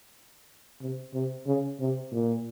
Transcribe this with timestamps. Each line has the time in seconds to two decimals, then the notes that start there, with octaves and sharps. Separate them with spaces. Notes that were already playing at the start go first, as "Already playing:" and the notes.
0.81 C3
1.14 C3
1.47 C#3
1.80 C3
2.13 A#2